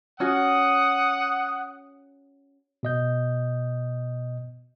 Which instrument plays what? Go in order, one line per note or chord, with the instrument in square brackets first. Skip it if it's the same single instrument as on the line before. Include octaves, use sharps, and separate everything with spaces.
[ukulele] C#4 F#4 [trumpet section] F#5 D#6
[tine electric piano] B2 D#5 G6